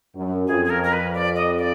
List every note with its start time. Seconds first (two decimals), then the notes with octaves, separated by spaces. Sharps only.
0.15 F#2
0.47 F2 G#4
0.65 G#4
0.70 A#4
0.83 A#4
0.93 B4
1.14 D5
1.36 D#5
1.58 D5